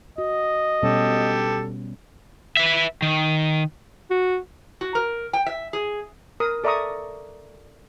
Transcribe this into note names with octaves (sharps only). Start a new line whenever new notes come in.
F#4 D#5
B2 G3 C#4 G4 A4
B4 E5
D#3
F#4
F#4
A#4
G5
E5
G#4
A#4 D#6
A4 D5 E5 A#5 C#6 D#6